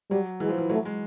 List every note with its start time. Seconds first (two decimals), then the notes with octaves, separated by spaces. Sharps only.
0.10 F#3 G3
0.40 E3 G#3
0.49 F3
0.58 E3
0.69 F#3 A3
0.85 G#3